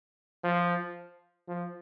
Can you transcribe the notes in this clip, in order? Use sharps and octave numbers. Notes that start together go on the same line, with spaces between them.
F3
F3